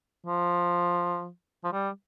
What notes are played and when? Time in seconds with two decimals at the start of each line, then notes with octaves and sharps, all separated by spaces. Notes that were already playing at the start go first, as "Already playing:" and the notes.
0.26 F3
1.64 F3
1.72 G3